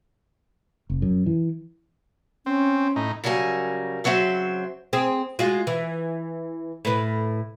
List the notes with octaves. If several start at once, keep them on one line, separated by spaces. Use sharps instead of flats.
F1
F#2
E3
C4 C#4
A2 D#4
C#3 F#3 G3 A#4 G#5
C#3 F#3 C4 C5 E5
C4 G#4
G#3 F4 F#4
E3
A2 B4